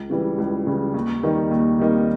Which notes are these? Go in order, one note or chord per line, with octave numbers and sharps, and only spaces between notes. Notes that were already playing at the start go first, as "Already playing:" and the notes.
Already playing: C#2
C#3 E3 G3
C#2
C#3 E3 G3
D#2
D#3 G3 A#3 D#4
D#2
D#3 G3 A#3 D#4